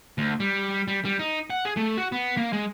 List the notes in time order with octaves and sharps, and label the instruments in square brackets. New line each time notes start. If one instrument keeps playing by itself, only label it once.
[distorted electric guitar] D2
G3
G3
G3
D#4
F#5
G#4
A3
F#4
B3
A#3
G#3